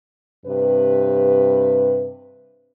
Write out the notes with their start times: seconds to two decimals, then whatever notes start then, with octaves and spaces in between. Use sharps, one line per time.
0.46 G2 C3 B4